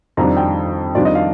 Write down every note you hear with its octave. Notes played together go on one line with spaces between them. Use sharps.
F2 D#3 G3 D4 A#5
G5
F2 D#3 G3 D4 F4 D5
D#5
F5